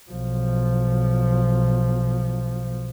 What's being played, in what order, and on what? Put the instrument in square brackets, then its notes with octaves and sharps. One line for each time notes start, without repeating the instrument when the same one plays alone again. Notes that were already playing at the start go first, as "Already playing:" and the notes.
[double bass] B1 F3